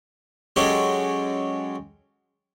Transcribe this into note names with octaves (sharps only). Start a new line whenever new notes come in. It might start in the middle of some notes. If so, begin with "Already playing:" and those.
F#3 G#3 C#4 F#4 G4 A4